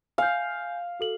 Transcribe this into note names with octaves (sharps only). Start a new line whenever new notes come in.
F5 G#5 G6
F#4 A4 F#7